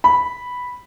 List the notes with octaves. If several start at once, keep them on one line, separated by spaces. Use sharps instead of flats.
B5